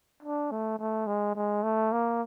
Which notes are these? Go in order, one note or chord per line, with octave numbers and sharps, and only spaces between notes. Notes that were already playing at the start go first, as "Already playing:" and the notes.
D4
A3
A3
G#3
G#3
A3
A#3